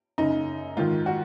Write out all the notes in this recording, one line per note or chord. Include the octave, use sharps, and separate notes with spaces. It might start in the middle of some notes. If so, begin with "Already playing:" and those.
F#2 C#3 D#4
G#2 D#3 F4
F#4